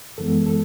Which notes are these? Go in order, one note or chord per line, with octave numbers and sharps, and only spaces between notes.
F#2 E3 G#3 B3 A4
A4